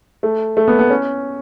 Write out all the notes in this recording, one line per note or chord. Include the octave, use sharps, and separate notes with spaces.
A3
A3
B3
B3
C#4